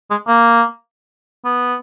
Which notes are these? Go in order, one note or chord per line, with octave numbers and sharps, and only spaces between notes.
G#3
A#3
B3